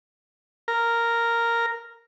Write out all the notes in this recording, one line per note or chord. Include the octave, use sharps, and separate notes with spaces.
A#4